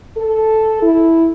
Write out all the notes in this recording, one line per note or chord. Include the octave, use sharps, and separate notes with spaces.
A4
E4